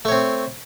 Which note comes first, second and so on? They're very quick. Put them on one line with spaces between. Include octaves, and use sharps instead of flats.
A3 C#5 C4